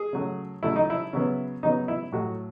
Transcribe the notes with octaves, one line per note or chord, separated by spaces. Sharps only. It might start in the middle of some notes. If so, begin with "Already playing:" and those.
Already playing: G#4
C#3 F#3 A3
C#3 F#3 A3 E4
D#4
E4
C#3 F#3 B3
C#3 F#3 B3 D#4
E4
A2 F#3 A3 F#4